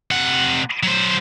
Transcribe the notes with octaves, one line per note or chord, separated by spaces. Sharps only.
C3 F#5
F#3 C5